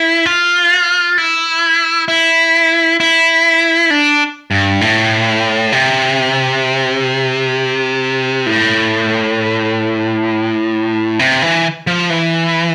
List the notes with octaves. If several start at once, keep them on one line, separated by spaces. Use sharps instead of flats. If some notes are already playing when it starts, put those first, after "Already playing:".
Already playing: E4
F4
E4
E4
E4
D4
G2
A2
C3
A2
C3
E3
F3
E3